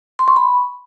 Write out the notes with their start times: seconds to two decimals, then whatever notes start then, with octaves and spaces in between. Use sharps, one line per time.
0.19 C6
0.28 C#6
0.36 B5